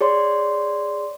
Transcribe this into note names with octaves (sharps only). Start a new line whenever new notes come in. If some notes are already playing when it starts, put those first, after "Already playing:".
G#4 C#5 D5 C6